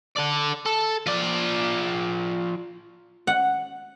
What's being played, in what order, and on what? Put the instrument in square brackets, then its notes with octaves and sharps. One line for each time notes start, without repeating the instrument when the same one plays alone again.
[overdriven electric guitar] A4 D5
A4
F3 D5
[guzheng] F#5